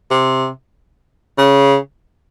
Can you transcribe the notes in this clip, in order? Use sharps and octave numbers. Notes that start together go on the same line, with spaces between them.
C3
C#3